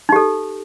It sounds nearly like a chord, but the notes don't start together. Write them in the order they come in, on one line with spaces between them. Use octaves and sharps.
D#4 G4 A4